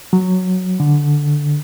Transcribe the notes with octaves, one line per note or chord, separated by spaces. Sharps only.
F#3
D3